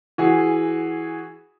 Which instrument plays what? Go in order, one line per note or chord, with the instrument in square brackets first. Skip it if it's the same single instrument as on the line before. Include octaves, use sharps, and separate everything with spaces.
[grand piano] E3 F#4 G#4